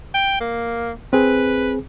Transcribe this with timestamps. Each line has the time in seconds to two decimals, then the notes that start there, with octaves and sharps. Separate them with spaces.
0.14 G5
0.40 A#3
1.13 C4 G#4 B4